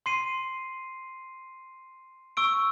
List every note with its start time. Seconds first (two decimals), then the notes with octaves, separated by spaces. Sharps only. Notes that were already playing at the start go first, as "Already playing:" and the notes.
0.06 C6 C7 D#7
2.37 C#6 E6 D7